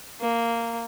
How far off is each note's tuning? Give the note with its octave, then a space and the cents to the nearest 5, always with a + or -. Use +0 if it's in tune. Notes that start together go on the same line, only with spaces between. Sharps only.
A#3 -10